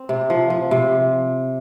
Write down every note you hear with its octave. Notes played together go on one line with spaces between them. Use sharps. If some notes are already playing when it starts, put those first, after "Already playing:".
Already playing: C4
C3
F3
F3
C3